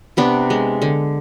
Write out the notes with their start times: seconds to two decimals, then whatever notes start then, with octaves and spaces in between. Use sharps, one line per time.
0.17 C3 B3 D4
0.50 G#3
0.82 D3